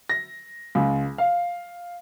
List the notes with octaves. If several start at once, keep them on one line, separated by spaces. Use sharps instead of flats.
A#6
C#2
F5